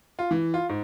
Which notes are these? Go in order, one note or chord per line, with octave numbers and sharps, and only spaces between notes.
F4
E3
F4
G#2